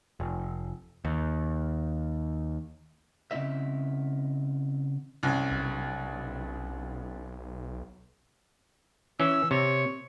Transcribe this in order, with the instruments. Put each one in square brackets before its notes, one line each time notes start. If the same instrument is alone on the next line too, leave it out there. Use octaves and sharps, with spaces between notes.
[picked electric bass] F1
D#2
[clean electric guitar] C#3 C4 E4 D#5 E5
[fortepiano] C2 F#2
[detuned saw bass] B1
[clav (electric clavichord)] E3 C#4 [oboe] E6
[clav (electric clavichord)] C3 [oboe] C#5